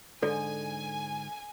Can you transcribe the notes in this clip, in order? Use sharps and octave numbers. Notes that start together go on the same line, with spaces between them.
G#2 D3 A4 D5 G#5